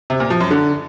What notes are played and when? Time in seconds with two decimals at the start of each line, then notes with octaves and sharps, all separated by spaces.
0.10 C3
0.20 A#2
0.30 F3
0.40 F#2
0.51 D3